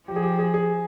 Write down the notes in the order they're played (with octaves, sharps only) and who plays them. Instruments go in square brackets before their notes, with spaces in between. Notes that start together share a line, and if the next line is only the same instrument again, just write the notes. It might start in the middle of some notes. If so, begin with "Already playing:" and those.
[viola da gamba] F3 [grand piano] G4
[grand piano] G#4
G4
G#4
G#4